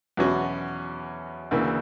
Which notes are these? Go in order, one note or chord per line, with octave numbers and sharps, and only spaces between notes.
E2 B2 F#3 C#4 F#4
D2 C#3 E3 A#3